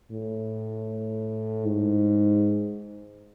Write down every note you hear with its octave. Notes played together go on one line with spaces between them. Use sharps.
A2
G#2